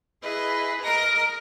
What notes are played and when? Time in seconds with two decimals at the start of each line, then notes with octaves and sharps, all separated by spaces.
0.23 E4 G#4 B4 D#5
0.81 A#4 D#5 A#5 A#6